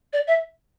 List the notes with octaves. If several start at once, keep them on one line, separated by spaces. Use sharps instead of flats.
D5
E5